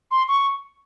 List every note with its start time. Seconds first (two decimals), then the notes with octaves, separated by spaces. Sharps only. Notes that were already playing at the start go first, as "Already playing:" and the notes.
0.11 C6
0.28 C#6